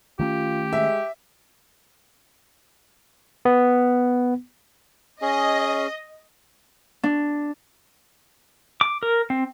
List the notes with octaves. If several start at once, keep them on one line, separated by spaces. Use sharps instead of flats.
D#3 A3 C#4 F4 G4
G#3 E5
B3
C#4 G#4 D#5
D4
D6
A#4
C4